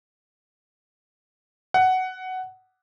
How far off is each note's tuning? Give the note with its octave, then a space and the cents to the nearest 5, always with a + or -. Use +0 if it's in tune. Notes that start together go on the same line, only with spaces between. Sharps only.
F#5 +10